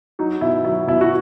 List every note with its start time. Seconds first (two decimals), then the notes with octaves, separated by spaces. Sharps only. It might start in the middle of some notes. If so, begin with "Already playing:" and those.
0.19 F#3 D#4
0.41 B2 E4
0.65 F#3 E4
0.87 B2 E4
1.01 F#4